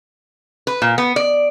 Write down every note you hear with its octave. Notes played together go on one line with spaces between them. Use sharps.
B4
A#2
B3
D5